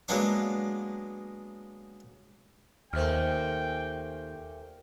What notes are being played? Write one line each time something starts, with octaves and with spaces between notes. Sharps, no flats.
F#3 G#3 A#3 B3 D4 D6
D#2 A#2 A3 A#3 C5 G5 F6